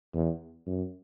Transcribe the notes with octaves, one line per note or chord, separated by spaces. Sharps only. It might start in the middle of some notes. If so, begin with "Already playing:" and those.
E2
F#2